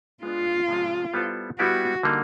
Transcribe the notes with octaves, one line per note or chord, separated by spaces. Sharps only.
G#3 B3 D4 F4
C3 F3 G#3 C#4
G3 B3 E4 A4 C5
G3 B3 E4 F#4 G4
D3 G3 A#3 D#4